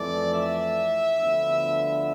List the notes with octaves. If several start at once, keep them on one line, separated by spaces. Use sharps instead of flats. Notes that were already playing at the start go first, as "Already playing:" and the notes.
Already playing: F2 E3 A3 D5
E5
D2 D3 F3 B3